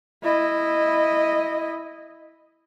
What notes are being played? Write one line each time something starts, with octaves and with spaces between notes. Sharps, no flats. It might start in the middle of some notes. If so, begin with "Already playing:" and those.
E4 D#5